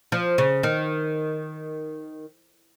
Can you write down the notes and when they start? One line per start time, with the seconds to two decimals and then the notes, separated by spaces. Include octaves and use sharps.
0.12 F3
0.38 C#3
0.63 D#3